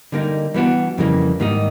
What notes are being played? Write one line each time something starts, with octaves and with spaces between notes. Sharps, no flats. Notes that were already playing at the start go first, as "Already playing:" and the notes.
D3 G3 A#3 D#4
E3 G3 B3 D4 F#4
F2 C#3 E3 G3 A#3
G#2 D#3 G3 A#3 D#4